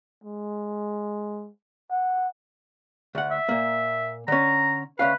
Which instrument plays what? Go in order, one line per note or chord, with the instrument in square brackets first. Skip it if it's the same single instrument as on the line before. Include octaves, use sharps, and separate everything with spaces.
[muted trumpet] G#3
F#5
[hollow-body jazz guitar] D2 F#5
[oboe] E5
[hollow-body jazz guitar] A#2 A#3
[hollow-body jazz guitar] D3 C#4 [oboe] A#5
[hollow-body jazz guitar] D2 C#4 F5 [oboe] B4